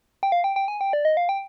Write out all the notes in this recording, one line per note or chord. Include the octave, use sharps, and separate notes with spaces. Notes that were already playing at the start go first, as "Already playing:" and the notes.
G5
F5
G5
G5
G#5
G5
D5
D#5
F5
G5